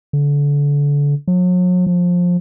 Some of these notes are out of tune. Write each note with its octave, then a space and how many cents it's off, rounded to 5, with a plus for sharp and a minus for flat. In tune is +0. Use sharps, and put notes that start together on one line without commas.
D3 -30
F#3 -40
F3 +20